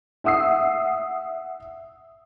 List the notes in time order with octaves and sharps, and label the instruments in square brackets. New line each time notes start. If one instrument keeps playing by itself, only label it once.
[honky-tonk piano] E5 F#5 D#6 E6 C7